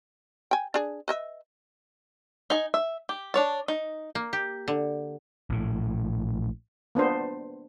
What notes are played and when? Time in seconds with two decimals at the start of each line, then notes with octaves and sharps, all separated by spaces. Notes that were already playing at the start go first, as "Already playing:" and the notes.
0.51 G5 G#5
0.74 D4 G#4
1.08 B4 D#5 E5
2.50 D#4 G#5
2.74 E5
3.09 G4
3.34 D4 C#5 A5
3.68 D#4
4.15 A#3
4.33 G4
4.68 D3
5.50 A#1 A2
6.95 A#3 B3 D4 C5